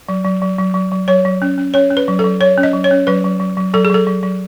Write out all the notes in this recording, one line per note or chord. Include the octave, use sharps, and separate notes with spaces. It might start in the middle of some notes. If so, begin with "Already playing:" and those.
F#3
F#3
F#3
F#3
F#3
F#3
F#3 C#5
F#3
C#4
C#4
C#4 C#5
C#4
B4
F#3
A4
F#3
F#3 C#5
C#4
D#5
F#3
C#5
C#4
F#3 B4
F#3
F#3
F#3
F#3 A4
G#4
F#3 A4
F#3
F#3